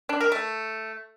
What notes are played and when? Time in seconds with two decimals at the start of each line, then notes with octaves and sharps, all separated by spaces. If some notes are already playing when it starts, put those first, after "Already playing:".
0.09 D4
0.21 A#4
0.32 A3